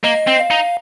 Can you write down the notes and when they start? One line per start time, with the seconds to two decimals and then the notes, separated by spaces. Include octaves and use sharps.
0.04 A#3 D#5
0.27 C4
0.40 F5
0.51 D#4